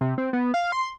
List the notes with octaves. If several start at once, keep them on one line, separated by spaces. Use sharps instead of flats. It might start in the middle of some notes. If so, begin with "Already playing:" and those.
C3
C4
B3
F5
C6